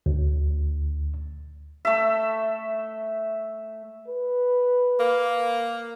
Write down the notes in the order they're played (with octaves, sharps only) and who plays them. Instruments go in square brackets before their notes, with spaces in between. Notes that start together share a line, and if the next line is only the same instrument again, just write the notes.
[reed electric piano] D2
[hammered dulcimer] A3 E5
[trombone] B4
[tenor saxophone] A#3